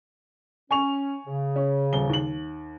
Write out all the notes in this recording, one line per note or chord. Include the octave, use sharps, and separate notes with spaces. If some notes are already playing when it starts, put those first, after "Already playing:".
C#4 G#5 C#6 F7
C#3
C#4
D#1 G7
D#2 F#7